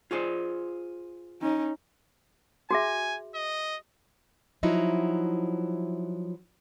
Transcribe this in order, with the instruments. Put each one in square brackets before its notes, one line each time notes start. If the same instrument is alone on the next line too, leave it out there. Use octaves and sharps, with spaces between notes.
[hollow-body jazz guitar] F4 G#4 C5
[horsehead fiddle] C#4 D#4
[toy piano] F#4 G#4 E5 [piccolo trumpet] G#5
[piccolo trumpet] D#5
[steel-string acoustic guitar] F3 F#3 D#4 E4